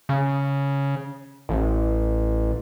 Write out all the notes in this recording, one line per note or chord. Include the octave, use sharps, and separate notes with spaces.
C#3
A1